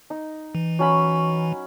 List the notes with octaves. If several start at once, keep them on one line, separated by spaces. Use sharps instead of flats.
D#4
E3
F#3 C#4 B5